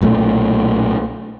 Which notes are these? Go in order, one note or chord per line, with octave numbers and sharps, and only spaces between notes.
B1 A#2 C#3 A3